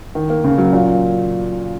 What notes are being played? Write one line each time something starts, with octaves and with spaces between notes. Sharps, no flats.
D#3
A#3
C#3
F#3
A#2